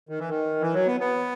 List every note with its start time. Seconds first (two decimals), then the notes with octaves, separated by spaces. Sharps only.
0.09 D#3
0.19 E3
0.29 D#3
0.61 E3
0.73 F#3
0.87 B3
1.00 B3